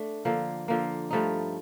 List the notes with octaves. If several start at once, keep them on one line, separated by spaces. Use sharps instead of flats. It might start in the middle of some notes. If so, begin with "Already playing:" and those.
Already playing: A3 D4
D3 F3 A#3
D3 F3 A#3
G2 F3 A3 D#4